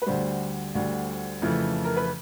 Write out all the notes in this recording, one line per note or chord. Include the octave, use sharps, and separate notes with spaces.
B4
D2 D3 G3 C5
D2 D3 G3
F2 C#3 E3 A3
A#4
B4